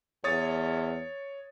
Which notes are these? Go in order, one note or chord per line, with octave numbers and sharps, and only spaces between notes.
E2 C#5 D#6 A6